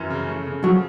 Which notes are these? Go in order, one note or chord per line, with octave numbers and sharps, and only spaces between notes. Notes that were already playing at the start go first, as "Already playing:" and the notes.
Already playing: F#2 E3
C#3
A3
C#3
F3 F#3